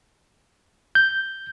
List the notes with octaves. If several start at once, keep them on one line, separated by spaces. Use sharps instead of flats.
G6